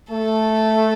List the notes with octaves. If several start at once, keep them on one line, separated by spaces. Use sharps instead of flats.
A3 A4